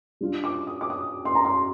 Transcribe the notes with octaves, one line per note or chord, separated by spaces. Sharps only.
G3 D4 F4
D6
D#6
D6
D#6
C6
A#5
C6